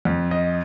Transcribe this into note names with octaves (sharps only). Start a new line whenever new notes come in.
F2
D#5